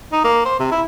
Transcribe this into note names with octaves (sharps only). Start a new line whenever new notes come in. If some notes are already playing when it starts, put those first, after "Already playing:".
D#4
A#3
C5
C3
E4